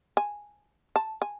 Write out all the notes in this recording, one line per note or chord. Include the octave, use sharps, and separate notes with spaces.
G#5
A5
G#5